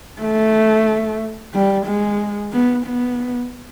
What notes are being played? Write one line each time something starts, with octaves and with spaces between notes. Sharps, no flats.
A3
G3
G#3
B3
B3